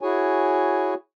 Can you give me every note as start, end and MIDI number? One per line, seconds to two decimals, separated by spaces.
0.01 0.94 64
0.01 0.94 66
0.01 0.94 68
0.01 0.94 73
0.01 0.94 80